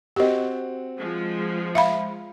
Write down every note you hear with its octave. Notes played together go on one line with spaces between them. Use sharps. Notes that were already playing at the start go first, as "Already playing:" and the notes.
C4 F#4 G4 D#5
F3 G#3
E5 F5 B5